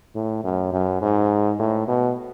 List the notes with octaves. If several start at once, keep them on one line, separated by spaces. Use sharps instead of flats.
A2
F#2
F#2
G#2
A2
B2